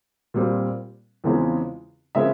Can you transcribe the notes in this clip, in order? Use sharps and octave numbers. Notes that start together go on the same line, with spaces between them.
A#2 G3 C4
E2 C#3 F3 G#3 C4
C#3 F3 G#3 C4 E5